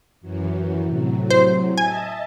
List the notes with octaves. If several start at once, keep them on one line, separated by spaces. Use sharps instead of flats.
F#2 E3 F#3
A2 C3 F#3
C5
D#5 E5 G#5 A5